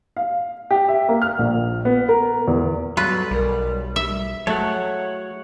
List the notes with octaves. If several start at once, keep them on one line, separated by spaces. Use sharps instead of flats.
F5
G4
E5
A#3
F6
A#1
B3
A#4
E2
F#3 G3 F4 A4 B4
B1 G3 G#4 A#4
E5
F#3 A3 E4 G#4 C#5 F5 F#5